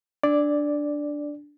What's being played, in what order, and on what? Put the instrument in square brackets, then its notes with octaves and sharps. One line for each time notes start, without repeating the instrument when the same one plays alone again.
[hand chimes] D4 [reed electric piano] D5